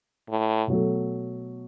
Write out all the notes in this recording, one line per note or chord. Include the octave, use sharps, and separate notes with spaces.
A2
B2 F#3 A3